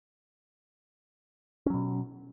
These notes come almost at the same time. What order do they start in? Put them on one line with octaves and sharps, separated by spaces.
C#4 F#3 B2